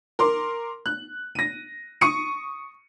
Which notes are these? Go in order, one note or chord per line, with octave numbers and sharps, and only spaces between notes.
A#4 C6 D6
F#6
A#6 D#7
C#6 D#6 C#7 D#7